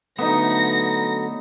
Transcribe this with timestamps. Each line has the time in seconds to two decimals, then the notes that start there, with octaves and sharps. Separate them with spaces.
0.19 D3 F#3 A3 B3 D#4 A#6